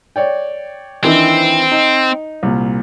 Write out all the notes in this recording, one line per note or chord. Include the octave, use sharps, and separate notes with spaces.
C#5 D5 G5
D#3 E3 C4 D4
D#4
C2 A#2